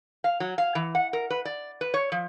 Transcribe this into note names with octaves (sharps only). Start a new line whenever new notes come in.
F5
F#3
F5
E3
F#5
A#4
B4
D5
B4
C#5
F3